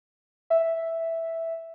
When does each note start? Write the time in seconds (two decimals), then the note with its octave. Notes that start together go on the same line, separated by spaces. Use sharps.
0.50 E5